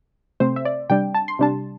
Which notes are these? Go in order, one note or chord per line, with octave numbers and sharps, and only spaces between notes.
C3 A3 C4 C5
E5
D5
C3 G3 D4 G5
A5
C6
C3 G3 D4 A5